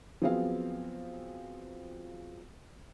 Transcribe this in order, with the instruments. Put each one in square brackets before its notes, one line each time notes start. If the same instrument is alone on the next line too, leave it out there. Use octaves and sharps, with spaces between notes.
[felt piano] F3 F#3 B3 C4 G#4 F5